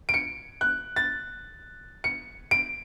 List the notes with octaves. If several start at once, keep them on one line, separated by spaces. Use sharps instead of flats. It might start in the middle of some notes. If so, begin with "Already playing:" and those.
D7
C#7
F#6
A6
C#7
D7